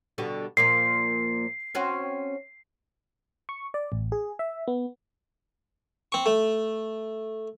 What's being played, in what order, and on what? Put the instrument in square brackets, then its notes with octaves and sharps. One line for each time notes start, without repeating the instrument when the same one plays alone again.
[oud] B2 D3 G3
[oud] A#2 F3 A#3 [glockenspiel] C7
[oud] C4 C#4 F#4
[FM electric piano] C#6
D5
A1
G#4
E5
B3
[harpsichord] C4 C#6
A3